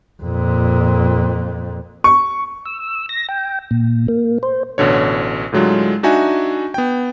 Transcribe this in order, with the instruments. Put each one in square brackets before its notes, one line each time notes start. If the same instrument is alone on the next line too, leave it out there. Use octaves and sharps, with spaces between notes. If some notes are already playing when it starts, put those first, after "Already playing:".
[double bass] F2 A#2
[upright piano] C#6
[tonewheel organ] E6
A#6
G5
A#2
A#3
C5
[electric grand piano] A1 B2 D3 C#5
A2 D3 F#3 G#3 F4
D4 D#4 F#4 E5 G#5
B3 G5